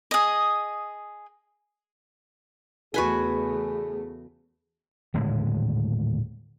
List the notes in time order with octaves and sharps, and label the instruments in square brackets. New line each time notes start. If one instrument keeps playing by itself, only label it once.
[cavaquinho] G#4 D#5
[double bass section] E2 C#3 A3 [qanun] F#4 B4 G#5 [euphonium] G#4
[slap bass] D#1 A2 D3 G#3